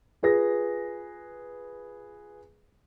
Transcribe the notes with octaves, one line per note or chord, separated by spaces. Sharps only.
F4 G#4 B4 A#6